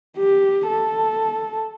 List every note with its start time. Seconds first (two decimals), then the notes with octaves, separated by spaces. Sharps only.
0.17 G4
0.67 A4